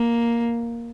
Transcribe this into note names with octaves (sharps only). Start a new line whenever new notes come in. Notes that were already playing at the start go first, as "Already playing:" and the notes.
Already playing: A#3